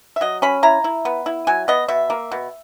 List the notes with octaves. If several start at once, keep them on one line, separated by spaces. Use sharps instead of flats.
E5
F#3 D#5
C#4 B5
E4 A#5
E4
B3
E4
F#3 G#5
B3 D#5
B2 E5
A#3
B2